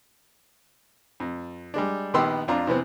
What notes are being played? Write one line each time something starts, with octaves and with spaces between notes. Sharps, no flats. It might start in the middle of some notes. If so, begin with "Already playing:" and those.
F2
G3 G#3 D4
A#1 D#3 B3 G4 C6 E6
F2 D4 F4 A#5
C3 E3 B3 C4